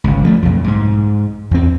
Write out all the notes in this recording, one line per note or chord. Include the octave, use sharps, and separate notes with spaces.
G1 C#2
F3 G3 A3
B1 F2
G#2
E2 C4